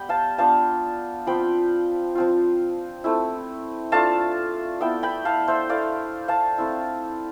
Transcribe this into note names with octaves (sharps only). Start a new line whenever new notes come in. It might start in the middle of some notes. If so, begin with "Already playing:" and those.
Already playing: G3 B3 G5 B5
F5 A5
B3 D4 F4 F5 A5
F3 C4 F4 G5 B5
F3 C4 F4
A3 C4 E4
A3 D4 F4 F5 A5
B3 E4 E5 G5
G5 B5
F5 A5
C5 E5
A3 E4 D5 F5
F5 A5
A3 C4 E4